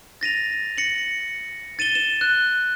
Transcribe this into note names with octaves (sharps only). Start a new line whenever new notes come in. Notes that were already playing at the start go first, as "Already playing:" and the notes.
A6 A#6 D#7 F7
A#6 C#7 F#7
A6 D#7 E7 G7
E7 G7
F#6